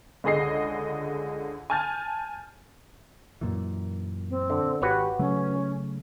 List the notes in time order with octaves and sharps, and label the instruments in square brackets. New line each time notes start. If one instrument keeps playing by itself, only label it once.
[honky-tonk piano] C#2 D3 G#4 D#5 C7
G#5 A5 F6 G6 A6
[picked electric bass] F#2 A#2 E3
[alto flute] C4
[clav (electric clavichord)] D3
[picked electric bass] G#1 [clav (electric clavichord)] F#4 B4 C#5 [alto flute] G4
[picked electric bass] C#3 F#3 A3 [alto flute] C#4